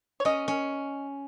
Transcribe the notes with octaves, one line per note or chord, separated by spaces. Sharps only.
C#5
C#4 D#5
C#4